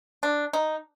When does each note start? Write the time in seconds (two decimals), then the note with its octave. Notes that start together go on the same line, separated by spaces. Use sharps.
0.23 D4
0.53 D#4